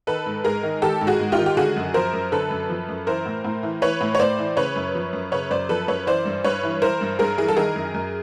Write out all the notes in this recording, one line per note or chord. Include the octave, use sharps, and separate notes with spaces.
D#3 A4 B4
G#2
G#2 G#4 A#4
D#3
D#3 G4 A4
G#2
F#4 G#4
G#2
F4 G4
D#3
G4
D3 F#4 G#4
F#2
F3 A#4 C5
F#2
D3 A4 B4
F#2
F3
F#2
E3 A#4 C5
A2
A2
E3
E3 B4 C#5
A2
C#5
A2 C5 D5
E3
C#3 B4 C#5
F#2
F3
F#2
C#3 B4 C#5
F#2 C5 D5
F3 A4 B4
F#2 B4 C#5
E3 C5 D5
G2
G2 B4 C#5
E3
E3 A#4 C5
G2
G2 G#4 A#4
E3 G#4
A4
D#3 G#4 A#4
F#2
F#2